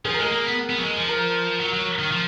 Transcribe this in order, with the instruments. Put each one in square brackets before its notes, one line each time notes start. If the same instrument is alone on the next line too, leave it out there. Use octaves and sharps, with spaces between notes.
[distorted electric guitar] F3 [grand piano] G#4
[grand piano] A#4
[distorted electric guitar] G#3 [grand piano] G#4
[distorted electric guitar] A#3
B3
B3
F#3
G#3
F3
[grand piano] A#4
[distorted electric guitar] F#3
F#3
D#3
F3